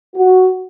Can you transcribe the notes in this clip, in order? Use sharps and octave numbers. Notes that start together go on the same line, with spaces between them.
F#4